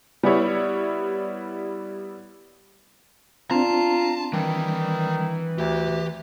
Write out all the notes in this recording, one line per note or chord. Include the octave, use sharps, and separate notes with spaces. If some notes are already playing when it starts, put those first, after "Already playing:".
G3 B3 E4 C#5
C4 D4 F4 A5 A#5
D#3 E3 G3
D2 G4